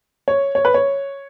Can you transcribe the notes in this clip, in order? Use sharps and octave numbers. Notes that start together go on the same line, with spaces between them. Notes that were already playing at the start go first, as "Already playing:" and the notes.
C#5
C#5
B4
C#5